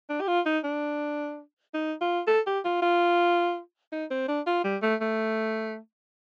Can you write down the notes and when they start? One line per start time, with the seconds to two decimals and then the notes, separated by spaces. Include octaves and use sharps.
0.10 D4
0.21 G4
0.28 F4
0.46 D#4
0.64 D4
1.74 D#4
2.01 F4
2.28 A4
2.47 G4
2.65 F4
2.82 F4
3.93 D#4
4.11 C4
4.29 D4
4.47 F4
4.64 G3
4.83 A3
5.01 A3